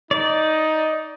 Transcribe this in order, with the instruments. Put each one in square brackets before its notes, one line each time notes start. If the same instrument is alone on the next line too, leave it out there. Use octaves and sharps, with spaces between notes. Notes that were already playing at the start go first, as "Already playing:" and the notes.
[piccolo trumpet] D#4 [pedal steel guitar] D5